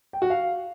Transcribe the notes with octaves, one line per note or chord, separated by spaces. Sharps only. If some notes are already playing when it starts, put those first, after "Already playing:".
G5
F#4
F5